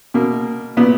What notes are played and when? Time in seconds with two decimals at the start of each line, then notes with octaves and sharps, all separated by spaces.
0.14 B2 A#3
0.77 A#2 B3